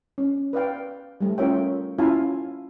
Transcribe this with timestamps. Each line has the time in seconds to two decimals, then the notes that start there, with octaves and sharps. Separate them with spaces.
0.18 C#4
0.53 B4 D5 F5 G5
1.21 G3 A3
1.38 C#4 F4 A#4 C#5 E5 G5
1.98 C#4 E4 F4 F5 G#5 A5